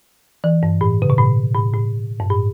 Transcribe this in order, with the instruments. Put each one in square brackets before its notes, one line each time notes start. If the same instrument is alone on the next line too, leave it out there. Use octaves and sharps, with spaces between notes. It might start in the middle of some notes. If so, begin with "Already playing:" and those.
[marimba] E3
G2
A2
C#3
B2
A2
A2
A2
G2
A2